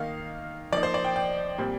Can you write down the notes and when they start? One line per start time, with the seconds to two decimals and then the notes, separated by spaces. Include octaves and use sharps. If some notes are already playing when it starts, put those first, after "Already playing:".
Already playing: D#3 A#3 D#4 F5
0.72 F3 A#3 D#4 D5
0.83 C5
0.94 D5
1.05 G5
1.16 G5
1.58 A#2 G3 C4